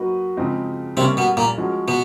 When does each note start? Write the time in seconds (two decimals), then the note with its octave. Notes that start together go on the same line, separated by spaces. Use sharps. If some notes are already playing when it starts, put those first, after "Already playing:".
Already playing: F#3 A#3 D#4 F#4 B4
0.37 C#3 F3 G#3 C4 D#4
0.97 C3 G3 A#3 C4 C#4
1.17 B2 B3
1.37 A#2 A#3
1.58 F3 G#3 C#4 F#4
1.88 B2 B3